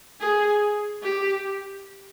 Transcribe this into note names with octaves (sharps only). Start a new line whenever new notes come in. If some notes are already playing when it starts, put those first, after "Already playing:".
G#4
G4